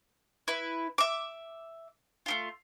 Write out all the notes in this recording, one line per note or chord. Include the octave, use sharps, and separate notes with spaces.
E4 B4
E5 D6
A3 E4 F4